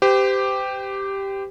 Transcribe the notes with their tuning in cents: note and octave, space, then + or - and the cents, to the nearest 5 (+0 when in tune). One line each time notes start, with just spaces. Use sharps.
G4 +0 C5 -40